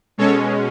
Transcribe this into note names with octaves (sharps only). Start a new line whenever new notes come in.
B2 G#3 C#4 A4 C#5